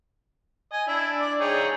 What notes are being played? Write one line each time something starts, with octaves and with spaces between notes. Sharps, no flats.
D#5 G#5
D4 E4
D5
D#4 G#4 C#5 G5